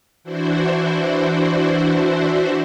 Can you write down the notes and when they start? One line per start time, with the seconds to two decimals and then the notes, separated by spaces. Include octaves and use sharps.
0.24 E3 D4 E4 F#4 C5